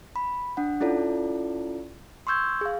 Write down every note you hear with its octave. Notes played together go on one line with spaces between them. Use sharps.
B5
D4 F#5
C#4 E4 F4 A4 D5
C6 C#6 E6 G6 G#6
G#4 F5